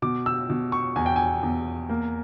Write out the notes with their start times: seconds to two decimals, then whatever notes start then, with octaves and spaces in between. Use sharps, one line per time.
0.02 B2 D6
0.26 E6
0.50 B2
0.72 C#6
0.96 E2 G#5
1.06 G5
1.16 G#5
1.43 E2
1.89 A#3